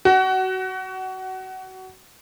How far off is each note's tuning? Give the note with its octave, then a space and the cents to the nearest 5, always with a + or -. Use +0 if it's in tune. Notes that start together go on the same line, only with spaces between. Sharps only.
F#4 +20